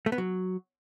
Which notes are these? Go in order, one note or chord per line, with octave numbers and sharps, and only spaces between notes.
A3
B3
F#3